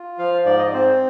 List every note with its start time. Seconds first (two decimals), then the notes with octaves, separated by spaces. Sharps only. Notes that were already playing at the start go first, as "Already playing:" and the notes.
Already playing: F4
0.18 F3 F5
0.45 G#2 D5
0.58 D#5
0.66 D5
0.73 C4 C5